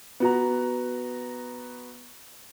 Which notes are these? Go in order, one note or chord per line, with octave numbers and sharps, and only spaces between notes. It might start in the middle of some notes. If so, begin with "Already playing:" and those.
B3 F#4 A#5